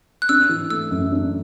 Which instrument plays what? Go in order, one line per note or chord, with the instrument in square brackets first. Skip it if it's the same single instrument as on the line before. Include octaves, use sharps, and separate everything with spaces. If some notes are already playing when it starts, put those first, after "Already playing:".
[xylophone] F#6
[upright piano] D4 [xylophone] E6
[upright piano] E3
[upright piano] A3 [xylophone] E6
[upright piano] F#2
D4